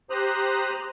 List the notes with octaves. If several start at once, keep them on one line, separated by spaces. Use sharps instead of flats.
G4 C5 A#5 D#6 F#6